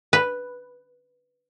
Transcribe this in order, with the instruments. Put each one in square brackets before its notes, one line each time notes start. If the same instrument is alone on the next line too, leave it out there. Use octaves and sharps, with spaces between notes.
[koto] B4